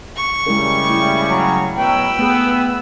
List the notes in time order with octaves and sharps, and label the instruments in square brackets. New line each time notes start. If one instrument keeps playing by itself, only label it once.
[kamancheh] C#6
[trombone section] C#3 G3 [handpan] G#3 E4 A#4
[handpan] A3 E4
[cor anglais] F#3
[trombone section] B2 F#3 [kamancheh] B4 E6 [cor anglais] G5
[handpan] A3 G#4 [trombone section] B3